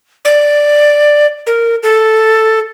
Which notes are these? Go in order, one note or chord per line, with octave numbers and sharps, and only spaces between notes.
D5
A#4
A4